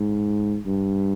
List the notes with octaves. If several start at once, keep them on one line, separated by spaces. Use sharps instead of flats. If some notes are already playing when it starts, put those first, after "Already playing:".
Already playing: G#2
G2